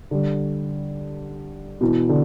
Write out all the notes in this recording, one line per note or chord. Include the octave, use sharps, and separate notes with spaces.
D3 G3
B2 E3
D3